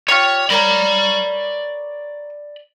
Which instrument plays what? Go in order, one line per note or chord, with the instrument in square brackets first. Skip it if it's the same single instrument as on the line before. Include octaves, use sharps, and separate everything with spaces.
[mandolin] F4 G4 C#6 [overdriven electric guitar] C#5
[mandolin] A#4 C#5 A#5 [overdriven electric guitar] D5 B5